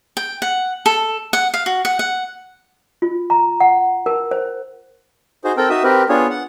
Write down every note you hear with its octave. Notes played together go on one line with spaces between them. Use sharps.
G5
F#5
A4
F#5
F5
F#4
F#5
F#5
F4
A#5
F#5
A#4
C5
D#4 F#4 G#4 C5
C4 A4 A#4 G5
D#4 F#4 E5 D#6
C4 G4 A#4 B4
B3 D4 F4 G#4 C#5
F#5